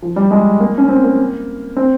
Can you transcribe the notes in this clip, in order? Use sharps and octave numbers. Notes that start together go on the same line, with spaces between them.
F3
G3
G#3
A#3
C#4
C4
A#3
C4